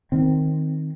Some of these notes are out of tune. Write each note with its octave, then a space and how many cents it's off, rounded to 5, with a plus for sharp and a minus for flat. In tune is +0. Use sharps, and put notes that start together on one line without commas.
D#3 +0 C4 +0